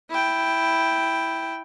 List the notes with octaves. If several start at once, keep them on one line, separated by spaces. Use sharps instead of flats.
E4 G5